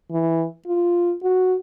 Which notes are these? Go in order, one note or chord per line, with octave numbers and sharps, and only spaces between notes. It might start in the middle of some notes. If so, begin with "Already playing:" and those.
E3
F4
F#4